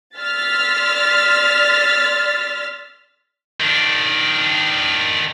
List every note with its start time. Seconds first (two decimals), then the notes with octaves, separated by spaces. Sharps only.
0.18 D5 C6 E6 F6 A6 B6
3.60 D#3 D4